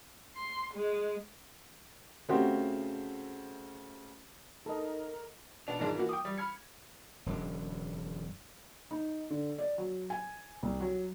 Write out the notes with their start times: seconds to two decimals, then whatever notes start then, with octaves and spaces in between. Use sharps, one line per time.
0.36 C6
0.74 G#3
2.29 C#3 A3 C4 F#4 G4
4.66 D#4 A4 A#4 D#5
5.67 B2 D4 F7
5.79 G#2 D#3 F3 G#3 D4
5.95 E3 A#3 F#4
6.09 G5 D6 D#6
6.25 G3
6.38 B5 F6 G#6 C#7
7.26 E1 F#2 D3
8.91 D#4
9.30 D3
9.58 D5
9.78 F#3
10.10 G#5
10.63 C2
10.81 F#3